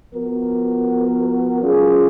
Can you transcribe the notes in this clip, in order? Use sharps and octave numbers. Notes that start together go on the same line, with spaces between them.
F3 B3 F#4 A#4
F#3 C#4 F4 G#4